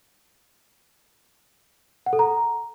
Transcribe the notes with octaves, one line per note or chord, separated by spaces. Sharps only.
F#5
A4
A#5